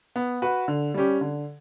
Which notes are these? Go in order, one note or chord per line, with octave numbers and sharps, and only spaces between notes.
B3
F#4 B4
D3
G3 C#4 G4
D3